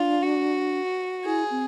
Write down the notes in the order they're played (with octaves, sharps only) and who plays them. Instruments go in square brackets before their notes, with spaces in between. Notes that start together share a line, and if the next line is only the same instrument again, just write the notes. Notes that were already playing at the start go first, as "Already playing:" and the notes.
Already playing: [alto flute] D4 [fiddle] F4
[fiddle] F#4
[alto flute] E4 [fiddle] G#4
[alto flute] C4